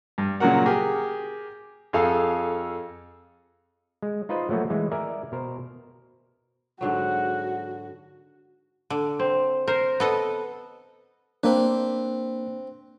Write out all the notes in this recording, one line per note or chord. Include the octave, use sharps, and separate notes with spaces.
G2
A#2 C#3 F#3 F#4 A#4 F#5
G4 G#4 A#4
F2 G#4 A4 F5
G#3
D#4 F4 B4 C5 D#5
F3 F#3 A3 A#3 F#4
E3 G#3
A#4 D5 E5 G#5
B2 A#4 C5
G#2 D3 F#3 F#4 F#5
D3
C4
A#4 C5
B3 A4 D#5
A#3 C4 D4 B4